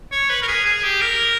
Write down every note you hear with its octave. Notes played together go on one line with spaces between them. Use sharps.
C#5
B4
A#4
G#4
G#4
G4
A#4